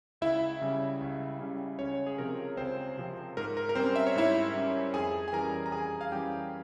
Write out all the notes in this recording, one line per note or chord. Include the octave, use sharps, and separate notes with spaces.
C#2 E4 E5
C#3 G3 C#4
C#2
C#3 G3 C#4
C#2 C#4 C#5
G#4
C3 F3 C4 A#4
C#2 C4 C5
C3 F3 C4
G#2 A#4
A#4
A#4
G3 C4 C#4 C5
E5
C#5
G#2 E4 E5
G3 C#4
F2 G#4 G#5
G#5
E3 G3 C#4 A#4 A#5
A#5
F2 G#4 G#5
F5
E3 G3 C#4 G4 G5